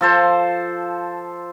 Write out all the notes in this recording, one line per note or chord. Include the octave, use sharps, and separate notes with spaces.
F3 A4 C5